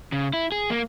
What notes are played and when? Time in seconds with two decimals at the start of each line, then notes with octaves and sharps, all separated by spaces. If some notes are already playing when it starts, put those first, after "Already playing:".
0.12 C#3
0.33 E4
0.52 G#4
0.70 A#3